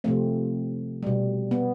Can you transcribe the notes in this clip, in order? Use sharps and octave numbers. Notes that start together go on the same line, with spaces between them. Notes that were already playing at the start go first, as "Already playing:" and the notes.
C3 F3 A3 C4
B2 G3
B3